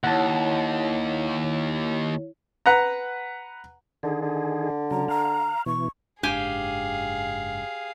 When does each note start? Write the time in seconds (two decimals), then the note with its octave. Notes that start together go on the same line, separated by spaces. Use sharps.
0.04 D#2 E4 C#5 F#5 A5
2.66 B4 F#5 A#5
4.03 D3 D#3 G#4
4.22 D3
4.91 C#3 F#3 A#5
5.08 F5 A#5
5.66 B2 E3 C#6
6.23 F#1 G#2 D4 G4 G#4 F5 G#5